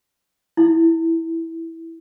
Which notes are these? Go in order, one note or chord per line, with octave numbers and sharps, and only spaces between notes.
E4